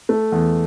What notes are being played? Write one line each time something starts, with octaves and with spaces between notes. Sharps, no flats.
A3
E2